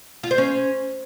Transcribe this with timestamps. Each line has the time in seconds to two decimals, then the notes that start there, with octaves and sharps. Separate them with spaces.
0.23 F4
0.31 C5
0.38 C#4